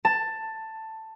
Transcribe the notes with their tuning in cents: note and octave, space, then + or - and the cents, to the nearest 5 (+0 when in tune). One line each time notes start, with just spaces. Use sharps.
A5 +10